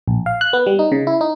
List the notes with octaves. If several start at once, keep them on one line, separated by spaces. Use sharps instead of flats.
A#1
F5
F#6
B3
G3
D#4
C#3
E4
D#4